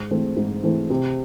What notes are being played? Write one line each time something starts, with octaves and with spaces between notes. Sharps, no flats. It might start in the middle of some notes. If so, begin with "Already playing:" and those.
Already playing: G#2
E3 A3 C4
G#2
E3 A3 C4
C3